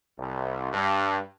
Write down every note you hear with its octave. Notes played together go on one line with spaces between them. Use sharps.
C2
G2